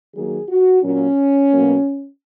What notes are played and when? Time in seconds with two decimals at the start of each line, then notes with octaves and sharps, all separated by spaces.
0.14 D#3 F#3 A#3 G#4
0.49 F#4
0.83 A#2 F#3 A#3 C#4
1.52 B2 F#3 A#3